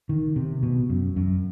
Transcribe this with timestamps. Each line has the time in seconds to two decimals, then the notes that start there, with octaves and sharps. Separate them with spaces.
0.09 D#3
0.36 C3
0.63 B2
0.90 F#2
1.16 F#2